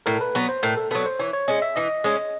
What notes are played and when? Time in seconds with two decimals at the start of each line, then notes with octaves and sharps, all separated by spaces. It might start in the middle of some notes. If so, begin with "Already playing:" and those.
0.06 A2 A#4
0.21 B4
0.35 F#3 B3
0.49 C5
0.63 A2 A#4
0.77 A4
0.91 F#3 B3 A4
1.06 C5
1.19 E3 C#5
1.33 C#5
1.48 G#3 C#4 D#5
1.62 E5
1.76 E3 D#5
2.04 G#3 C#4